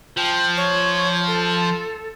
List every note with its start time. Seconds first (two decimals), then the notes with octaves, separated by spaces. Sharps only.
0.17 F3 G5
0.57 C#5
1.27 A4